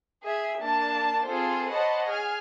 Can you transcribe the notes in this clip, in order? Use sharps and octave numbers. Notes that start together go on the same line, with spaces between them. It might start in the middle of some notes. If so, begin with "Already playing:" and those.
G#4 E5
A#3 D4 A5
C4 F4 G#4 A4 C5
C5 C#5 D#5 F#5 A5 B5
G#4 G#5 F6